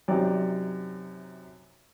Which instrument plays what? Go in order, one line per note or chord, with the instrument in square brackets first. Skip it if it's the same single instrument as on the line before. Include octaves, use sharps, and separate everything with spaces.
[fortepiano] F#2 C3 D#4 D5 G5